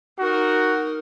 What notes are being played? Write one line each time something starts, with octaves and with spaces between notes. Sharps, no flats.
D#4 F#4 A#4